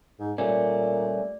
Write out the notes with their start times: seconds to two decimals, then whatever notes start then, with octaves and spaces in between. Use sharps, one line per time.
0.19 G#2
0.38 A#2 G3 A3 C#4 D5